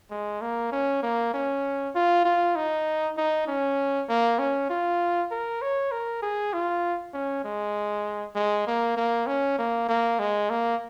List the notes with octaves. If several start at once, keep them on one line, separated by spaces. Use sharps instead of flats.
G#3
A#3
C#4
A#3
C#4
F4
F4
D#4
D#4
C#4
A#3
C#4
F4
A#4
C#5
A#4
G#4
F4
C#4
G#3
G#3
A#3
A#3
C#4
A#3
A#3
G#3
A#3